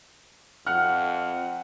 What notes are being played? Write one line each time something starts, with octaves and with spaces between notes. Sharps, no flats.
F2 F#5 F6 F#6